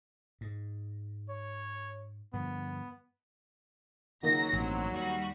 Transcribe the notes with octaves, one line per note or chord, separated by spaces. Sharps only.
G#2
C#5
G2 D3 F3 B3
C#2 D#3 F#3 A#3 D#4 A#6
A1 G2 C4
D#2 G3 F#4